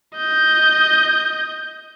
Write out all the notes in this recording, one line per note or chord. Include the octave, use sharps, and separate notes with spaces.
D#5 G6